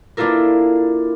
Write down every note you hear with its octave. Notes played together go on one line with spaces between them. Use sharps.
A#3 D4 E4 F4 A4 A#4